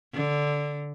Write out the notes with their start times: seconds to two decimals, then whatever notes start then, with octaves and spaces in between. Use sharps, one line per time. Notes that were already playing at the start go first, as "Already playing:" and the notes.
0.14 D3